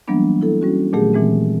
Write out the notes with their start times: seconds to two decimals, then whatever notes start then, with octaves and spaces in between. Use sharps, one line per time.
0.08 E3 F#3 G3 A#3 B3 D4
0.41 E4 A4
0.61 G3 C#4 F#4
0.93 A#2 D#3 F#3 A3 G4 G#4
1.13 A#2 E3 G#3 C4